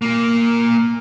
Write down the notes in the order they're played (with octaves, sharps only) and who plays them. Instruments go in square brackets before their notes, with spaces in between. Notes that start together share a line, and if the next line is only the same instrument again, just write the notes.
[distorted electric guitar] A#2 A#3